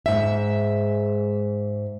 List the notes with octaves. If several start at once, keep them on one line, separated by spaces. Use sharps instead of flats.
G#2 E5